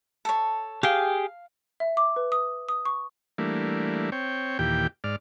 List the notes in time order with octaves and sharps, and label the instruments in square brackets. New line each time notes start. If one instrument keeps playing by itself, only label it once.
[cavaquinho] A4 C#5
[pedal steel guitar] G4 G#4 G5 [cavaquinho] F5
[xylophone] E5
D6
B4
D#6
D#6
C#6
[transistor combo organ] E3 G3 A3 A#3 D4
C4 C#5 G5
D#2 A#2 E3 G4 G5
G#2 D5 F6